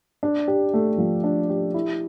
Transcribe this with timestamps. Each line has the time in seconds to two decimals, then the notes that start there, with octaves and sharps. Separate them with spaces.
0.23 D4
0.48 G4
0.74 A3
0.98 F3
1.24 D4
1.50 G4
1.74 E4